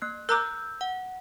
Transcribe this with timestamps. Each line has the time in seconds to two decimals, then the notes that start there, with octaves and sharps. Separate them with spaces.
0.02 A#3 F#6
0.29 A#4 A#5 D6 E6 F#6 G6
0.81 F#5